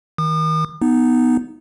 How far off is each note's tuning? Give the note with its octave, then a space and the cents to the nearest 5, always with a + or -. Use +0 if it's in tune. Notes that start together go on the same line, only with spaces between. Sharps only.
D#3 +30 D#6 -45
B3 +0 D#4 +0